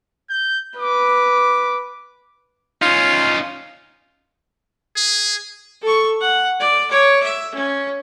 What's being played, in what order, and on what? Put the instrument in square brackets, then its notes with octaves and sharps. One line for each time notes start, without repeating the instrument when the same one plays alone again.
[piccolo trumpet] G6
[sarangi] B4 [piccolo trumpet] D6
[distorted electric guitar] C#4 D#4 [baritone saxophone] F4
[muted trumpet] G#4
[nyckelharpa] A4 C#6
F#5
D5
C#5 D6
E5
C#4